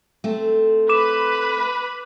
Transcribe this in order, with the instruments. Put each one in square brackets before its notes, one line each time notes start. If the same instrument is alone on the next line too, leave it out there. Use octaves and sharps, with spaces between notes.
[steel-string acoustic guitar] A3 C4
[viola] B4 B5 [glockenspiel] D6 E7